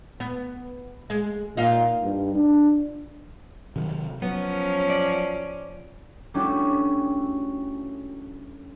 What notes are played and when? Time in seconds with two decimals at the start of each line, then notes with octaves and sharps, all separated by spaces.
0.20 B3
1.10 G#3
1.57 A#2 D#4 F4
2.03 G2
2.35 D4
3.76 C3 D#3 F#3
4.22 F3 F#3 B3 C#4
4.90 D5
6.34 G3 A3 C#4 D4 E4 F#4